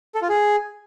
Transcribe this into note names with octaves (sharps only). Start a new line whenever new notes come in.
A4
F4
G#4